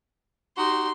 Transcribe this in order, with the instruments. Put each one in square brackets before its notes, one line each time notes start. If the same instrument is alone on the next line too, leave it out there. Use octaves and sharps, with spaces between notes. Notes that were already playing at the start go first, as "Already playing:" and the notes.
[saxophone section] D#4 F#4 G4 [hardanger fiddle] C6